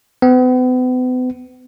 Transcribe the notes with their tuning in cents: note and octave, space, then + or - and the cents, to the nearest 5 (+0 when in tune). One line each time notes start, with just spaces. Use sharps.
B3 +40